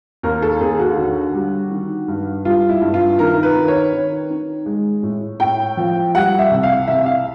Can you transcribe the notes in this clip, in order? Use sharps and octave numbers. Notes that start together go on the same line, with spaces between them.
D#2 A#4
A4
D#2 G#4
F#4
D3
G3
D#3
G2
G3 F4
E4
G2
F4
D#3 A#4
B4
D#3
C#5
D#3
D#3
G#3
A2
A2 G5
F3
G3 F#5
E5
C2
F5
C2 E5
F5